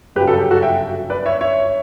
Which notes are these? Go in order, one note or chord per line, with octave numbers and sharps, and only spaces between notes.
G1 F#2 C#3 F#3 G4 B4
F#4 A4
G4
F#4 A4
E5 G5
B4 D5
C#5 E5
C#5 E5